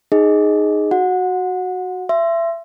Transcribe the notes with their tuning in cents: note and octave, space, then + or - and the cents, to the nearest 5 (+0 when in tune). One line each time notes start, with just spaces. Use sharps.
D#4 -10 G#4 +0 D#5 +5
F#4 +0 F#5 -25
E5 +25 C6 +0